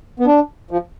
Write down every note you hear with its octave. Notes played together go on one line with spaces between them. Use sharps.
B3
D4
F3